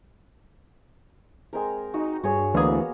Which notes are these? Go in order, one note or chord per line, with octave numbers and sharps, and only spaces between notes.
G#3 C4 A#4
D#4 F#4
G2 F#4 G#4 C#5
D2 E3 A#3 B3 G#4